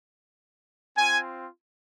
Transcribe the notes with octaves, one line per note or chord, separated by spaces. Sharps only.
C4 F4 G#5